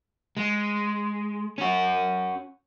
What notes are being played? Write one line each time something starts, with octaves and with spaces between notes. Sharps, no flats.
G#3
C#4 F#4